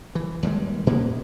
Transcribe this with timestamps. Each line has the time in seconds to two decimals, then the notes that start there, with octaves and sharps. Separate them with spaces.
0.15 E3
0.43 D#2 G3 G#3
0.87 A#2 A#3 B3